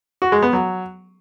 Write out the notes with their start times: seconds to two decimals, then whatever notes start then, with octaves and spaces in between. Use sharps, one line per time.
0.22 F#4
0.32 G#3
0.42 B3
0.53 F#3